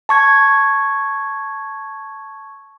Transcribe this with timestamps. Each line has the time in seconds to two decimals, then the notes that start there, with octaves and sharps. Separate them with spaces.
0.09 A5 C#6 G#6